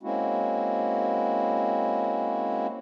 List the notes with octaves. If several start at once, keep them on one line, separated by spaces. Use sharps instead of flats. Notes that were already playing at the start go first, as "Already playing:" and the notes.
G#3 A#3 C4 C#4 E4 F#4